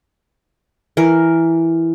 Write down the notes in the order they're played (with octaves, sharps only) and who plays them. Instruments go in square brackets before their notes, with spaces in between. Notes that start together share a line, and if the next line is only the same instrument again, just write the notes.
[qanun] E3 A#4